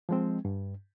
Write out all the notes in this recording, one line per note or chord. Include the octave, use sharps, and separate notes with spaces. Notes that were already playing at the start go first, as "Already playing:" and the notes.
F3 G#3 C4
G2